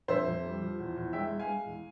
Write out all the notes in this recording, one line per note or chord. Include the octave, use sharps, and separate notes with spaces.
F2 C5 E5
F2
G3
F3
E2
E2
G#3 E5 G5
G#3
F5 G#5
G#3
E2